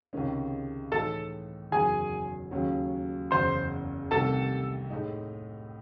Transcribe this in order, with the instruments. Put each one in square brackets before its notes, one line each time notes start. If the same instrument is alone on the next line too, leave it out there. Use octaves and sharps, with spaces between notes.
[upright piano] C#2 C3 D#3 G#3 C#4
[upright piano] A2 E3 G#3 D#4 [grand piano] A4 A5
[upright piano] F#1 E2 D#3 F#3 [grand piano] G#4 G#5
[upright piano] D#2 C#3 F#3 C#4
[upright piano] F#1 E2 C#3 [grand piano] C5 C6
[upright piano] C2 C3 D#3 A3 [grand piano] A4 A5
[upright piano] A2 G#3 D#4